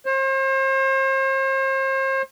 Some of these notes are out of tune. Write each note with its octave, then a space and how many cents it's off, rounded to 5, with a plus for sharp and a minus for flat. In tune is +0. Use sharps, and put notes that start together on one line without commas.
C5 +40